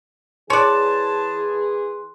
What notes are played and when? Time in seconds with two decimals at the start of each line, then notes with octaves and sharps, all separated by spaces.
0.50 E3 G#4 C#5 D5 A5 C6 F#6